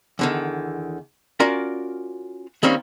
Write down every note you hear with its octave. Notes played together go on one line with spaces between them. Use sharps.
E2 D3 D#3
C#4 F4 F#4 A#4 D5
D#3 G3 A#3 C4 C#4